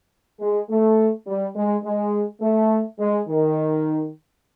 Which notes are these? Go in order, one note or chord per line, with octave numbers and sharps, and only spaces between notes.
G#3
A3
G3
G#3
G#3
A3
G#3
D#3